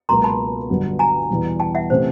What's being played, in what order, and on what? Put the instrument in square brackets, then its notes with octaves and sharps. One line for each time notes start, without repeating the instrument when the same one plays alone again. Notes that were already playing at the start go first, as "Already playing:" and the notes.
[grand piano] C#2 B2 F#3 A#3 [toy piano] A#5 C6
[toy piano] A5 B5
[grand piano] G1 G2 D3 F#3 B3
[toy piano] G#5 A#5
[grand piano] E2 B2 G3
[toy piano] G5 A5
E5 F#5
[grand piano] C3 E3 A3 C#4 [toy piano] C5